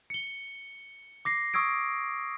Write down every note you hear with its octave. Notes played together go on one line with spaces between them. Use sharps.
C#7 G7
D6 A#6 C7
C#6 D#6 E6 G#6 D7